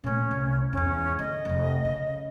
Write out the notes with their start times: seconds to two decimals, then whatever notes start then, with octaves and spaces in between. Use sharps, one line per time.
0.04 A#2 A3 C#4
0.31 C2
0.73 E2 G#2 C#4
1.19 D2 D#5
1.45 F1 F2
1.85 C#3